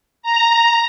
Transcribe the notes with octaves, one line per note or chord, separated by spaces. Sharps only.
A#5